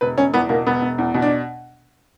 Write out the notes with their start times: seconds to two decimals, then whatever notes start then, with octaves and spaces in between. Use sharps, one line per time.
0.01 E1 B4
0.17 E1 C#4
0.34 E2 B3
0.49 B2 A#3
0.66 E1 B3
0.82 E1
0.98 E2
1.14 B2
1.22 D4